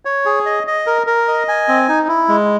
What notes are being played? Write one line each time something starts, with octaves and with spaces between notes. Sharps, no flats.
C#5
G#4
D#5
D#5
A#4
A#4
D#5
G#5
C4
D#4
E4
G#3